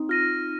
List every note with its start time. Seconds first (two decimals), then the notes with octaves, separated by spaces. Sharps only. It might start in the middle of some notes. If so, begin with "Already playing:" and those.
Already playing: C4 D#4
0.09 F4 F6 A#6 D#7